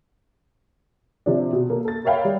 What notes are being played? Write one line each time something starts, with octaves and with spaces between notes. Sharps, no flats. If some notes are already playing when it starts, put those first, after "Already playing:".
C3 F3 D4
B2
A#3 A4
A4 A6
A#4 C#5 E5 F5 G5 B5
G3